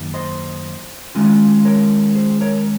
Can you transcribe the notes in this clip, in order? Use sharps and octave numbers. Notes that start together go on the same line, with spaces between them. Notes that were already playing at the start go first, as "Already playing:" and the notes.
Already playing: F#2 D#3 A#3 D#4
C5 D#5
D#3 G#3 C#4 F4
A#4 C#5
G#4 C5
A#4 C#5